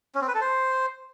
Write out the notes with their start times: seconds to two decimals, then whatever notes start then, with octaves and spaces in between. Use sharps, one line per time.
0.15 C#4
0.21 C4
0.28 B4
0.35 A4
0.41 C5